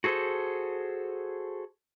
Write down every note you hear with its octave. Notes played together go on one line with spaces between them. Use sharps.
F#4 G#4 A4 C5